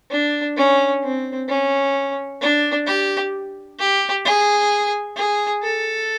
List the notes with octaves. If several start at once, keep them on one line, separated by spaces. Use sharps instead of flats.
D4
C#4
C4
C#4
D4
G4
G4
G#4
G#4
A4